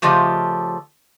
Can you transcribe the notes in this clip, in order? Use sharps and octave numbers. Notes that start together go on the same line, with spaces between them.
C#3 F3 A3 F4 G4 D#5